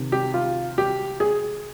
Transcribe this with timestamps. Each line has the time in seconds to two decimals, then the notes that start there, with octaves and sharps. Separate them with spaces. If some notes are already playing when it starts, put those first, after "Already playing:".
Already playing: C3 D#3
0.12 G4
0.34 F4
0.78 G4
1.20 G#4